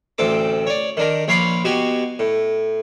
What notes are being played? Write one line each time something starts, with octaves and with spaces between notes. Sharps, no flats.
A1 D2 C4 A4 D6
C#5 D5
D#3 D4 A#4
A#1 C#5 F5 B5 C6 D6
B2 F#4 G4 G#5
A2